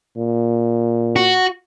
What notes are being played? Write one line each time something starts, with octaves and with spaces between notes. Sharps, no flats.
A#2
F#4